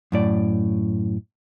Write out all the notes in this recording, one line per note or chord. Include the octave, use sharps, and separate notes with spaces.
F#2 A2 D5